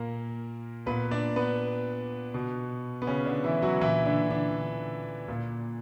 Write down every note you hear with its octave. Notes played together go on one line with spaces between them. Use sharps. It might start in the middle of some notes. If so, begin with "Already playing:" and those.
Already playing: A#2 A#3 A#4
A#2 B3 B4
D4 D5
B3 B4
B2
B3
C#3 C#4
D3 D4
E3 E4
F#3 F#4
A#2 E3 E4
D3 D4
D3 D4
A#2